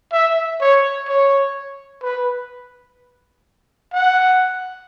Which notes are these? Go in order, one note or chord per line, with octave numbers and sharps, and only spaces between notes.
E5
C#5
C#5
B4
F#5